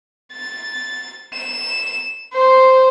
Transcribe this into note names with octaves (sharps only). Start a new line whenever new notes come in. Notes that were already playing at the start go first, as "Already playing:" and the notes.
A6
E7
C5